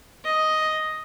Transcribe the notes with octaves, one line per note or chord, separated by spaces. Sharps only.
D#5